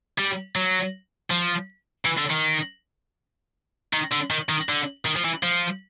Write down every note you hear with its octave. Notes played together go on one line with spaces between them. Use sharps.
G3
F#3
F3
E3
D3
D#3
D#3
D3
D#3
D#3
D3
D#3
F3
E3
F3